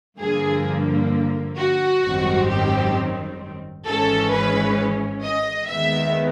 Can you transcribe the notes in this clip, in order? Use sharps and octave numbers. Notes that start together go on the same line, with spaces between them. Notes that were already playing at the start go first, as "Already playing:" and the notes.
G2 D3 F3 A#3 G#4
F#4
G#1 F#2 D#3 G3 C4
G4
G#1 G#2 E3 G#3 C#4 A4
B4
D#5
D#2 D#3 G#3 B3 E5